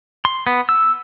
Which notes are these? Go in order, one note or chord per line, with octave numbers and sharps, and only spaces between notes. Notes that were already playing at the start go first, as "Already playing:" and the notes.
C6
B3
E6